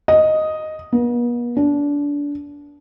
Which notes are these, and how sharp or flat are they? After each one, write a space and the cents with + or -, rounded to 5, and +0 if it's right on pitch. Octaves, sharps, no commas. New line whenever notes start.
D#5 +0
B3 -45
D4 -25